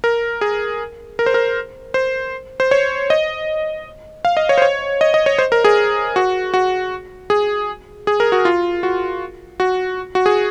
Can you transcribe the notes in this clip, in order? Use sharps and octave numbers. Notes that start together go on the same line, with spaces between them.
A#4
G#4
A#4
C5
A#4
C5
C5
C#5
D#5
F5
D#5
C#5
C5
C#5
D#5
D#5
C#5
C5
A#4
G#4
F#4
F#4
G#4
G#4
A#4
F#4
F4
F#4
F#4
F#4
G#4